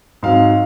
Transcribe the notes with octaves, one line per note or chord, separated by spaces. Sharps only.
G#2 F#3 C4 F5